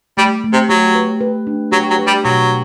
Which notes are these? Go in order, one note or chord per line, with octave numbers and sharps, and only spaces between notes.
G3 A3
A3
C3
F#3 G4
B4
B4
D4
F#3 G4
F#3
B4
G3
B2 F#3